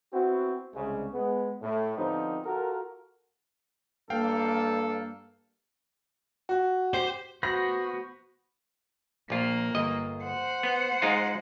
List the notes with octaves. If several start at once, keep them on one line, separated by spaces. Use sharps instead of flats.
B3 C4 E4 F#4
C2 C#3 G#3
G#3 B3
A2
D3 F3 B3 C4 D#4 G4
F4 F#4 A4 A#4
G2 A#3 A4 F5 G5
F#4
G4 C5
B3 F#4 C5 B5 A#6
A#1 A#3 F4
G1 D#5
C5 F#5
B3
G#3 D#4 F4